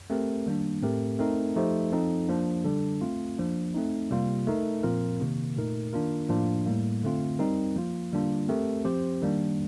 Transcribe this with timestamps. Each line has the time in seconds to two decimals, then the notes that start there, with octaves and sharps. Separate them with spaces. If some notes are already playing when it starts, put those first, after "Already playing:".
0.10 A3 C4 G4 A#4
0.46 D#3 G3 A#3 D4
0.82 A2 A3 C4 G4 A#4
1.19 A3 C4 D#4 A#4
1.56 F3 A3 D#4 G4 C5
1.92 F3 C4 D#4 A4
2.29 F3 A#3 D4
2.64 D3 G3 D4 A4
3.01 A3 C4 F4
3.38 F3 A#3 D4
3.74 A3 C4 D#4
4.11 C3 G3 A#3 F4
4.47 A3 D#4 A#4
4.83 A#2 F3 C4 F4 A#4
5.20 C3 D#3 A#3
5.57 A#2 A3 D#4 A#4
5.93 D#3 A#3 D4 F4 A#4
6.29 A2 F3 A#3 D4 F4
6.66 A2 G3 A#3
7.03 D3 A3 C4 F4
7.39 G3 C4 D#4 A#4
7.76 F3 A#3 F4
8.13 D3 G3 A#3 D4 F4
8.49 A3 C4 G4 A#4
8.85 F3 C4 G4 C5
9.22 D#3 G3 A#3 D4